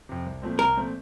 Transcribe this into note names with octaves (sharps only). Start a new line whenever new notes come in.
F2 C3
C2
A#2 F3 A3 C4
C2 A#4
A#2 F3 A3 C4